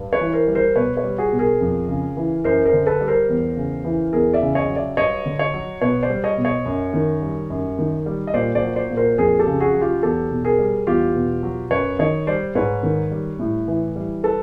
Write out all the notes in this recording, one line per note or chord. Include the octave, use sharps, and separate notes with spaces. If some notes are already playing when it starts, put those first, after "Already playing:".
Already playing: G2
B4 C#5
E3
A#4 C5
G3
A#4 C5
B2 B4 C#5
B4 C#5
G3
F#4 G#4
B2
G#4 A#4
F2
C#3
E3
F#2 A#4 C5
A#4 C5
D3
A4 B4
G3
A#4 C5
E2
C#3
E3
E2 G#4 A#4
D5 E5
C#3
C#5 D#5
F#3
D5 E5
G2 C#5 D#5
D3
C#5 D#5
F#3
B2 B4 C#5
C5 D5
G3
C#5 D#5
B2
C#5 D#5
F#2
D#3
G3
F#2
D#3
G3
D#5
A#2 C5 D5
C5 D5
F#3
C5 D5
A#2
A#4 C5
F2 G#4 A#4
G4 A4
C#3
F#4 G#4
F#3
F4 G4
E2 G4 A4
B2
G#4 A#4
G3
E2 F4 G4
B2
F#3
F#2 B4 C#5
D#3 C#5 D#5
G3 C5 D5
G#2 B4 C#5
D#3
G3
A2
E3
G3
A4 B4